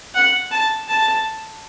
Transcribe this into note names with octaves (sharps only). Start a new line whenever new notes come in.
F#5
A5
A5